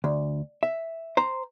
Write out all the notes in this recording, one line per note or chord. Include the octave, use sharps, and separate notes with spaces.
D2
E5
C5 A#5